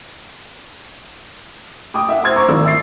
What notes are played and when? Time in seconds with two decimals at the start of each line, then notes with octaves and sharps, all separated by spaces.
1.94 G5 D6 D#6
2.09 E5 F#5
2.23 C5 C6 E6 G#6
2.36 C5 A#5 C#6 D6
2.48 G#1 D5 E6
2.64 E5 C6 E6 A6 C7